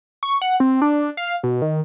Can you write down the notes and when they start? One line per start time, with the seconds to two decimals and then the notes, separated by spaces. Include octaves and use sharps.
0.23 C#6
0.42 F#5
0.60 C4
0.82 D4
1.17 F5
1.43 B2
1.62 D#3